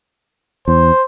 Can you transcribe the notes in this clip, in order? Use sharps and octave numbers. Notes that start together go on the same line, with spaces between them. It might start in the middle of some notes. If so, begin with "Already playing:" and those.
E2 C5